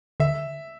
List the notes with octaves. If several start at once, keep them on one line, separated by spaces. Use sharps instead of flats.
D3 E5